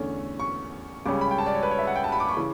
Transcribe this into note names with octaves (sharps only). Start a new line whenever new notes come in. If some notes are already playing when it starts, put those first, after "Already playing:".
Already playing: E2 D3 A3 C#4
C#6
C#2 C#3 G3 C#4 D6
B5
G5
A5
D5
C#5
B4
C#5
E5
F#5
G5
A5
B5
D6
C#6
C#3 E3